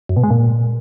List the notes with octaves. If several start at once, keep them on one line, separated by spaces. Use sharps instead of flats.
F#2
B2
G#3
A#2